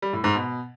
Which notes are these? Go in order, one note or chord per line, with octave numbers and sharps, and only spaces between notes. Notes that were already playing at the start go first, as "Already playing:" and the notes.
G3
A2
G#2
B2